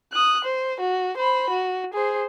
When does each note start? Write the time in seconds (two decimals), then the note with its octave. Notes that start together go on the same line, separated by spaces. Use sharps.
0.13 D#6 F#6
0.44 C5
0.80 F#4
1.17 C5 B5
1.50 F#4
1.93 G#4 C5